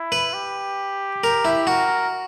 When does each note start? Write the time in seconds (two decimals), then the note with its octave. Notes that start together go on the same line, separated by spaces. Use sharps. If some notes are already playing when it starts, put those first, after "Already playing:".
Already playing: E4
0.12 B4
0.34 G4
1.24 A#4
1.45 E4
1.67 F#4 A#4